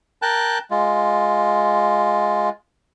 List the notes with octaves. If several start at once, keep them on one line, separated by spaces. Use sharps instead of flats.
A#4 G5 A5 F#6
G#3 F4